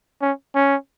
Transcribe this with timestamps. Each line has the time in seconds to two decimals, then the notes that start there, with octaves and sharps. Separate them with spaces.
0.22 C#4
0.55 C#4